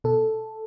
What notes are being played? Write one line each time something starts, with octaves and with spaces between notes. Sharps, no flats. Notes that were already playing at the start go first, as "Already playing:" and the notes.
B2 A4